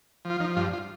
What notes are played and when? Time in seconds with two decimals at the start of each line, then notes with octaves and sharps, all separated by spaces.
0.25 F3
0.30 F4
0.40 F3 D#4
0.56 G2 F4
0.73 F4